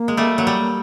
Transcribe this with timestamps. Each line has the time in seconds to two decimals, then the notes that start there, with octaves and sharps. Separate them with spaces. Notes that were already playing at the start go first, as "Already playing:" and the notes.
Already playing: A#3
0.08 G#3
0.17 G3 A3
0.38 F#3
0.47 G3